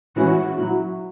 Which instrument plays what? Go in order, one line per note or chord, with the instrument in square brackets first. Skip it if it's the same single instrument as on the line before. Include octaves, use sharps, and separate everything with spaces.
[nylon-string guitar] E3 G#3 C#4 E4 [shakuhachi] F#4
[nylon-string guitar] F#3 E4